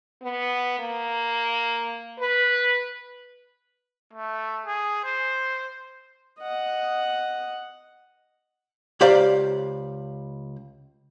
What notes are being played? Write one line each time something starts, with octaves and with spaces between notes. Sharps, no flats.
B3
A#3
B4
A3
G#4
C5
D#5 F#5
C#2 G4 C5 D5 F5 A#5